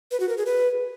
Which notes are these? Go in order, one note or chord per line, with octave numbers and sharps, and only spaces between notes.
B4
F#4
A#4
G#4
B4